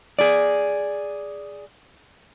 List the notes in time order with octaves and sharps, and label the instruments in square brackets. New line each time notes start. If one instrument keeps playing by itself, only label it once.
[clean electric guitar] G#4 D5